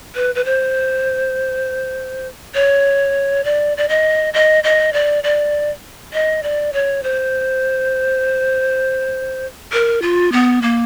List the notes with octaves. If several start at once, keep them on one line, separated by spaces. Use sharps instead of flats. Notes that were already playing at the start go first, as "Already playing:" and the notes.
B4
B4
C5
C#5
D5
D5
D#5
D#5
D#5
D5
D5
D#5
D5
C#5
C5
A#4
F4
B3
A#3